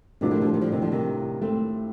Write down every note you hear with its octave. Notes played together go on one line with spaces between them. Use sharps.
A2 C3 D#3 G3 D4 F4 A#4
D3 F3
D3 F3
D#3
D3 F3
C3 D#3
D3 F3
C3 D#3
A3 C4